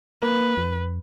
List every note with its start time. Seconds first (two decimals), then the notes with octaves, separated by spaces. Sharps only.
0.23 A#3 B4
0.57 F2